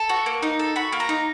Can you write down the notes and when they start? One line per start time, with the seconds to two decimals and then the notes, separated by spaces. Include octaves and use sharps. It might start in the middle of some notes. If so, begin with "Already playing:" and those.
Already playing: A4
0.09 F#4
0.26 A#3
0.42 D#4
0.59 A4
0.76 F#4 B5
0.92 A#3
1.00 A#5
1.09 D#4